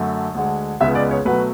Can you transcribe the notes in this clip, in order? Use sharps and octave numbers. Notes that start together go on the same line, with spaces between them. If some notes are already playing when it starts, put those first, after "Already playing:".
Already playing: F#2 D3 A3
D2 D3 G#3
C#2 C#3 G#3 B3 E5
D5
C#5
B2 F#3 A3 B4